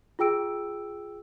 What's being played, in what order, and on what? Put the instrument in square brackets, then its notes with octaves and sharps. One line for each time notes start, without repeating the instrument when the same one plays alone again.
[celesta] F4 G#4 G5 E6 D7